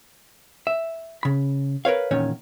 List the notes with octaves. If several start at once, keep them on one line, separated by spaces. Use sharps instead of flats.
E5
C#3 B5
A#4 B4 C#5 F5
E2 A#2 D#3 C#4 C#5